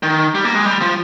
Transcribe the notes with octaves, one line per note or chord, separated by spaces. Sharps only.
D#3
G3
A#3
G#3
G3
F3